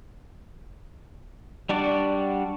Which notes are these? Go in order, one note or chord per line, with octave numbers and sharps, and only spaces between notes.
G3 D4 F#4 D5